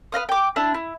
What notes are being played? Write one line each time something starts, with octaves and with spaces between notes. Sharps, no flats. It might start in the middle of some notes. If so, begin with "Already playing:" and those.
B4 D#5 F5 D#6
G5 D6
D4 E4 A5
E4